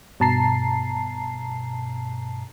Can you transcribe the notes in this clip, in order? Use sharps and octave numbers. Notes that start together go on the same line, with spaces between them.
G2 B2 A5 A#5 C7